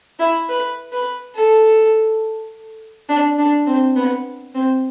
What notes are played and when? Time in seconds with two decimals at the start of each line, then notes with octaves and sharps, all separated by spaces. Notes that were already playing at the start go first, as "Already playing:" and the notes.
0.19 E4
0.49 B4
0.92 B4
1.35 A4
3.09 D4
3.38 D4
3.67 C4
3.96 B3
4.54 C4